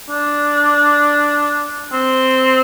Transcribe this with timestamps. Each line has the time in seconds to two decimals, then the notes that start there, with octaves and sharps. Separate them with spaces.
0.09 D4
1.93 C4